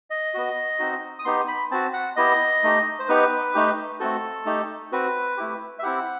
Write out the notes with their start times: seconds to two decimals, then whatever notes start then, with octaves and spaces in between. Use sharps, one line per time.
0.10 D#5
0.34 B3 F#4
0.79 C4 D#4 F#4
1.19 D#6
1.25 B3 D#4 G4 C6
1.48 B5
1.71 C4 F#4 A5
1.94 F#5
2.16 B3 E4 G4 D#5
2.63 A3 D#4 G4
2.99 C5
3.08 B3 D#4 G4 B4
3.54 A3 D#4 G4
4.00 A3 C4 F#4 A4
4.45 A3 D#4 G4
4.92 C4 F#4 B4
5.37 A3 E4 G4
5.79 E5
5.83 C4 E4 G4 F#5